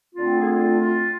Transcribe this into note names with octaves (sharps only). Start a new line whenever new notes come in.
D3 A3 C4 F4
G#4
F4
F4